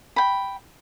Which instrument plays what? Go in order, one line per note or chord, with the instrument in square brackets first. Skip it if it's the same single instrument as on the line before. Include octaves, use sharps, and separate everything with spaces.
[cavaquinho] G5 B5